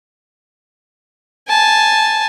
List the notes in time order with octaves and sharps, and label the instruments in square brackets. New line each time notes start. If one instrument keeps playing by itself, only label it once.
[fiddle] G#5 A5